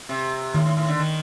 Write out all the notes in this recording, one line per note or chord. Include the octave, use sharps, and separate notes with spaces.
C3
A2 D#3
A2
A2
D3
D#3